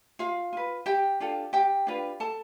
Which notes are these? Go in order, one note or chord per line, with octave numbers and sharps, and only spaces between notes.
F4 F5
F4 B4
G4 G5
D4 F4 A4
G4 G5
D4 F4 B4
A4 A5